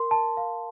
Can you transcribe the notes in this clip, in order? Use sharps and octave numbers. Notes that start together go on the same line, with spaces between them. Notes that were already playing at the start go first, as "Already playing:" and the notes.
Already playing: A#4 C6
A5
F5